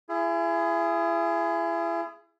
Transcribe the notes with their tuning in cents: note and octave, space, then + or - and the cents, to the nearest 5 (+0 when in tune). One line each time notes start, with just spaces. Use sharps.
E4 +35 G#4 +0